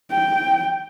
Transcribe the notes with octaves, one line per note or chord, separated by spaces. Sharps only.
G5